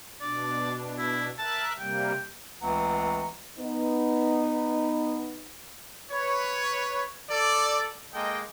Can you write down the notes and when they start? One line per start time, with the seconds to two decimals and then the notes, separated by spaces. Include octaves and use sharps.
0.21 B2 D4 D5
0.98 E4
1.39 A#4 E5 A5 F#6
1.79 C3 G3 A#3 G5
2.62 C#2 E3 A3 C4 F#5 A#5
3.59 B3 D#4
6.12 B4 C#5
7.30 A4 D5
8.13 G#3 A#3 A4 D#5 G5